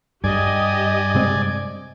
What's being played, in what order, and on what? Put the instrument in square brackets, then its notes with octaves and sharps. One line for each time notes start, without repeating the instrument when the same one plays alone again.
[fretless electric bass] G2 [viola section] G4 D#5 [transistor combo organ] D5 G#5
[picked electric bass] C3 G#3 C4